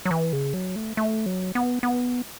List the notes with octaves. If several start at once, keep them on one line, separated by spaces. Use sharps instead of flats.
F#3
E3
C#3
F#3
A3
A3
F#3
B3
B3